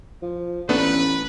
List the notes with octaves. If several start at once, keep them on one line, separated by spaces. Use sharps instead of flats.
F3
A1 A3 B3 D4 B4